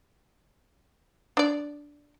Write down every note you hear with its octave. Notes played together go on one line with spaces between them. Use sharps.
D4 D5